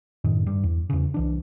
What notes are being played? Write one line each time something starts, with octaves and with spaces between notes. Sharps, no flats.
F#2 A2 D#3
G2
E2
E2 C#3
C2 E3 D4